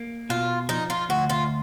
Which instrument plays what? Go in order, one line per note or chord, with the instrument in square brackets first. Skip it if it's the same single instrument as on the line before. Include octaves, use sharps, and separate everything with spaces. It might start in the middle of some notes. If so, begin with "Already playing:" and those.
Already playing: [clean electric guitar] A#3
[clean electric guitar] B2 [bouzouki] F4
[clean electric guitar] F3 [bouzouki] D#4
[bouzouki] F4
[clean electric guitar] D2 [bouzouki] F#4
[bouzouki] F4